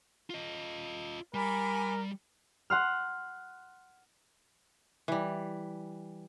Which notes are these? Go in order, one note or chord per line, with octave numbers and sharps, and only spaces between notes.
F4 D#5
G3 A#4 G#5 B5 D6
F#5 C6 F6
E3 G3